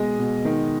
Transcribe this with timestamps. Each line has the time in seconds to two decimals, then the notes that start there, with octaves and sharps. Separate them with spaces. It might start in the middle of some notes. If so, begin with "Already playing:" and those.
Already playing: B2 G#3 D#5
0.19 B2
0.45 D#3